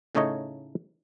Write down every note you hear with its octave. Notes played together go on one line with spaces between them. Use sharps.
A2 C#3 A3 D#4 C#5 D#5